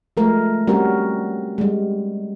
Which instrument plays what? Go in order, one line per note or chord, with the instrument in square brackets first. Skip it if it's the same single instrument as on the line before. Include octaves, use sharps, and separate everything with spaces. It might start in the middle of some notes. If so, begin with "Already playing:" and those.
[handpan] F3 G#3 A3 A#4
G3 C4 C#4 F#4 A#4
G3 G#3